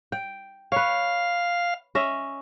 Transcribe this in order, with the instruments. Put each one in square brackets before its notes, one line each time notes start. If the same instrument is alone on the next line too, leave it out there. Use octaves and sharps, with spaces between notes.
[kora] G5
[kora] B4 C#5 [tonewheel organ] F5
[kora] C#4 D#5 E5